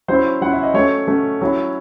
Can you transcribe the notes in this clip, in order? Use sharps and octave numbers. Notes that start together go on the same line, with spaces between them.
F#3 C#4 E4 C5
F#3 C#4 E4 F#5
E5
D#5
F#3 A3 C#4 C#5
F#3 A3 C#4
F#3 C#4 E4